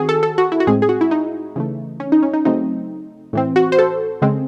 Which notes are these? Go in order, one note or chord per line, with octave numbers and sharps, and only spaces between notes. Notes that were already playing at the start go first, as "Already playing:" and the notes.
Already playing: D#3 C4 F#4 G#4
A4
A4
F#4
E4
F#4
A2 G#3 C4 G#4
G#4
F#4
E4
D#4
C#3 E3 A3
C#4
D#4
C#4
D#4
C#3 F#3 A3 C4 D#4
A2 E3 C4
F#4
C5
A4
C#3 G#3 C4